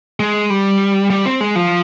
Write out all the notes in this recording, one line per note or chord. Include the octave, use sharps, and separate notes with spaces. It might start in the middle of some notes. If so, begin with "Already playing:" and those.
G#3
G3
G3
C4
G#3
F3